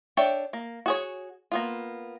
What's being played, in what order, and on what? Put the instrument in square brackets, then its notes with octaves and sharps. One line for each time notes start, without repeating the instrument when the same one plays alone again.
[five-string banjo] D4 C#5 E5 G5
A#3
F#4 G#4 C#5
A#3 B3 F4